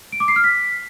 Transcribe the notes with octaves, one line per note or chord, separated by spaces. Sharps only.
D7
D6
C7
F6
B6